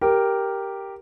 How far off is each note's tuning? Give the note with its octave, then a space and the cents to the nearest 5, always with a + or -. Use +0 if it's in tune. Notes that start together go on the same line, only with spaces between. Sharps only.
G4 +0 A#4 +0